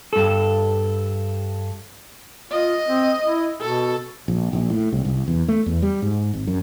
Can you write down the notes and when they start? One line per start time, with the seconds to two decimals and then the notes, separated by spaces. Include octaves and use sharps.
0.13 G2 A4
2.51 F4 D#5
2.88 C4
3.23 E4
3.61 B2 A4
4.28 A#1
4.53 A#1
4.70 A2
4.92 C2
5.05 C2
5.28 E2
5.48 A3
5.66 E2
5.82 G3
6.02 G#2
6.34 G#1
6.47 F#2